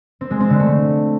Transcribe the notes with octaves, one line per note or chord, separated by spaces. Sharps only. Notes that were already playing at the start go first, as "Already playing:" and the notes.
C4
G#3
C4
D3
A3